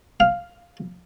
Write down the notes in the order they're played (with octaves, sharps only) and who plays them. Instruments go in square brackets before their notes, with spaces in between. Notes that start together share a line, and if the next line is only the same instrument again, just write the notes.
[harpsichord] F5